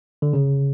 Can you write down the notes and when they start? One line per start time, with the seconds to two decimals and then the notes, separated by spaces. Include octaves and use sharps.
0.22 D3
0.33 C#3